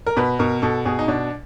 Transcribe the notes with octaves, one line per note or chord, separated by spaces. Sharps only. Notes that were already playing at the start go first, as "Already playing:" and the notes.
A#4
B2 B4
B2 A#4
B2 A4
B2 G#4
D#4
B2 D4